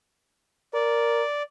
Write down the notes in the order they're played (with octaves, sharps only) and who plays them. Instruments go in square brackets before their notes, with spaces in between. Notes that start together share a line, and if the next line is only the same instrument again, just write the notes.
[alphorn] A#4 [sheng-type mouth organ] D5